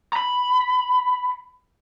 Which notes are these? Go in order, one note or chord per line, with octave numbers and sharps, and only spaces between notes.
A#5 B5